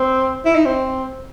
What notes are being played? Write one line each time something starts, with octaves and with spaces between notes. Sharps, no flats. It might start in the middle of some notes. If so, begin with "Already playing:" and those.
Already playing: C4
E4
D#4
C4